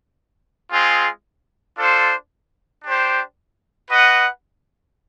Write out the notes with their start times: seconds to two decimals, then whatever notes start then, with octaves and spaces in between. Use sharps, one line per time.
0.71 G#3 C4 F4 G#4
1.77 D4 F4 A4 C5
2.84 D4 G4 C5
3.90 F#4 B4 D#5 F#5